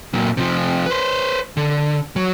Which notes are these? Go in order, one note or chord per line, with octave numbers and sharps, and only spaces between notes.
A#2 F#3
C3 F3
B4 C5
D3
F#3